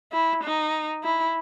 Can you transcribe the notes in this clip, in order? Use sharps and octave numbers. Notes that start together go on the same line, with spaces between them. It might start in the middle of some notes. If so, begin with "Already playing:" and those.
E4
D#4
E4